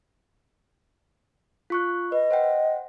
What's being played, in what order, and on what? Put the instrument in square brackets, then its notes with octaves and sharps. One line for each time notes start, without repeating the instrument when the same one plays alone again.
[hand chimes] F4 C#6 F#6
[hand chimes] B4 [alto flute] D#5
[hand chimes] C5 F#5 G5